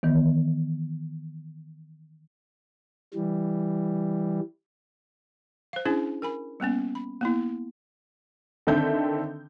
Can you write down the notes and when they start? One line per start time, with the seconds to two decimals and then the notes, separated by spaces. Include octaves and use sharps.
0.03 D#3 E3 B3
3.14 E3 G3
5.73 C5 F5
5.85 C#4 D4 E4 G#4 C5
6.22 A#4 G#5 B5
6.60 G3 A#3 B3 C#4
6.95 B5
7.21 A#3 B3 E4
8.67 D3 D#3 C4 A4 E5 G6